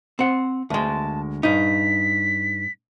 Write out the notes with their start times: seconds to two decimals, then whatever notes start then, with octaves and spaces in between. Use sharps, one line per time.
0.19 C4 F#5
0.70 D2 G#3 A5
1.43 G2 D#4 B6